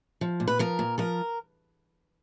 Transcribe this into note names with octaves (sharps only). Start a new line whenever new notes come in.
F3
A#2
B4
F3 A#4
A#2
F3 A#4